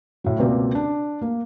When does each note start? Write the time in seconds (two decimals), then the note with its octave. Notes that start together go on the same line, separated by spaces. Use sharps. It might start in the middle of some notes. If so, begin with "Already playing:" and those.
0.24 A2 F#3
0.38 C#2 B2 A#3 C4 D5
0.75 D4
1.22 A#3